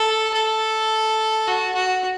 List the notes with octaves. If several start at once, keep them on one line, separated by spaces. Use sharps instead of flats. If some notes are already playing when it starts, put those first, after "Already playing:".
Already playing: A4
A4
F#4
F#4